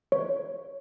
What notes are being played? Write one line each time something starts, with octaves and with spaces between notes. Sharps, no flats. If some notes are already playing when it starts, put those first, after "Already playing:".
C#5